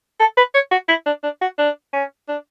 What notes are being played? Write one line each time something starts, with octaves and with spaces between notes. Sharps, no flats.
A4
B4
C#5
F#4
E4
D4
D4
F#4
D4
C#4
D4